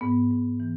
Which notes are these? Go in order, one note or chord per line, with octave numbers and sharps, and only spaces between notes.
G#2 B3
G#2
E3